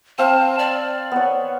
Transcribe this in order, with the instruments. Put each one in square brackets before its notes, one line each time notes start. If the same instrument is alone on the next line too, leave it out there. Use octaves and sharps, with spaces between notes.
[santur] C4 F5 [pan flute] A5
[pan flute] D5
[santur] B3 C#5